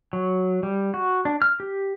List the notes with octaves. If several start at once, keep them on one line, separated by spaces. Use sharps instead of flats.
F#3
G3
F#4
D4
F6
G4